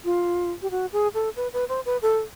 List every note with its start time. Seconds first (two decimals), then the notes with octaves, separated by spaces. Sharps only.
0.05 F4
0.62 G4
0.71 F#4
0.93 G#4
1.14 A4
1.36 B4
1.53 B4
1.69 C5
1.86 B4
2.02 A4